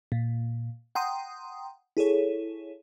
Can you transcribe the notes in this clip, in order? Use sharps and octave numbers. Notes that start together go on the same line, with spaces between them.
A#2
F#5 G5 A#5 C6 D#6
E4 G#4 A4 C#5